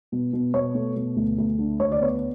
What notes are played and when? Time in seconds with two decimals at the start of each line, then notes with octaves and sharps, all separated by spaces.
0.12 B2
0.33 B2
0.54 B2 C#5
0.75 A3
0.96 B2
1.16 D2
1.38 D2
1.58 D3
1.80 D2 C#5
1.92 D5
2.01 B3 C#5